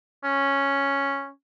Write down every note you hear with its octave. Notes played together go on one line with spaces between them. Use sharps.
C#4